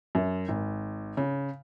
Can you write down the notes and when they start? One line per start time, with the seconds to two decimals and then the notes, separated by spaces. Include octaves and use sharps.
0.15 F#2
0.48 G#1
1.17 C#3